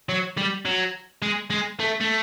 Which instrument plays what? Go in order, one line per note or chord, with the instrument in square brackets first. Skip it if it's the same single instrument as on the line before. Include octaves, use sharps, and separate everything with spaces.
[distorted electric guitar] F#3
G3
F#3
G#3
G#3
A3
A3